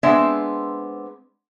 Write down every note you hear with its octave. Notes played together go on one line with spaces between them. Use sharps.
G#3 B3 C4 D4 E5